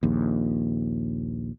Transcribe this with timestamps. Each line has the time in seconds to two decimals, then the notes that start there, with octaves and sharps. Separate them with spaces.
0.03 A#1 D#2